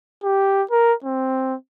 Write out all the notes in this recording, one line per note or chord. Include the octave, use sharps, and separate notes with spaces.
G4
A#4
C4